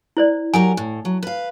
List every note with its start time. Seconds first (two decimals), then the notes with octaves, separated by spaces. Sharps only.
0.17 E4 C5 D5
0.54 F#3 G4 A#4 G#5
0.77 A2
1.05 F#3
1.23 B4 F5